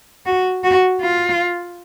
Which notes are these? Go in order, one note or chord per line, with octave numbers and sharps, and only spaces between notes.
F#4
F#4
F4